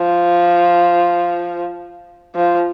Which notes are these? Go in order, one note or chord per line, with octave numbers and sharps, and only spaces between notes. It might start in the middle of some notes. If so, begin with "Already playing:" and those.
Already playing: F3
F3